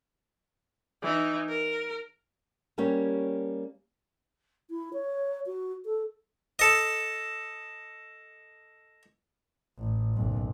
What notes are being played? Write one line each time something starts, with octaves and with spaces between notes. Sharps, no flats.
E3 D#4
A#4
G3 A#3 C#4 G4 C#5
E4
C#5
F#4
A4
A4 D#5
A1
F#1 B1